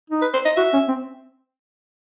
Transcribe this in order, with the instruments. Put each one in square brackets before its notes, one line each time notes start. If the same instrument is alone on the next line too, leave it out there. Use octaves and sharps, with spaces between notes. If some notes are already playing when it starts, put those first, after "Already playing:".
[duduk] D#4
[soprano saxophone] B4
C5
D#5
[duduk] F#4 [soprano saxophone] E5
[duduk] C#4
C4